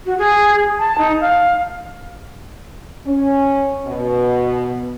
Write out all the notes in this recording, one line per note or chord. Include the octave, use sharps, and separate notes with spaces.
F#4
G#4
A5
D#4
F5
C#4
B2